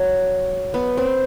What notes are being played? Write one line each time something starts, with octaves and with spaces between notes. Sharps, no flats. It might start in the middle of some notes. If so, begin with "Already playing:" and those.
Already playing: F#3
B3
C4